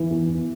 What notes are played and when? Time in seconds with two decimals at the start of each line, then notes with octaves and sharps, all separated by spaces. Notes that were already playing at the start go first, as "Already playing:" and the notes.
Already playing: E2 E3
0.11 E2
0.28 E2